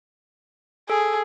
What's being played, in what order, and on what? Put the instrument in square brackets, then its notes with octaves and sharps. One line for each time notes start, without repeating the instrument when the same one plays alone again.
[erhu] G#4 [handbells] A4